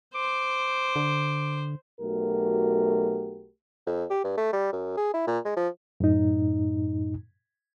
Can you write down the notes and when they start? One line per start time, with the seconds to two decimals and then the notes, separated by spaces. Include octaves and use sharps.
0.15 C5 D6
0.96 D3
2.01 B1 A3 F#4 G4 A#4
3.87 F2
4.10 G4
4.24 G2
4.37 A3
4.53 G3
4.73 F#2
4.97 G#4
5.14 E4
5.27 A#2
5.45 G#3
5.57 F3
6.00 F#2 A2 D#4